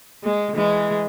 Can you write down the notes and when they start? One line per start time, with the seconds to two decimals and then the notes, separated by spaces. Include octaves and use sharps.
0.24 G#3
0.55 E3 G#3